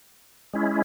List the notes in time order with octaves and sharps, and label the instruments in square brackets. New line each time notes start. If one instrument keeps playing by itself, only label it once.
[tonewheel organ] G#3 C#4 E4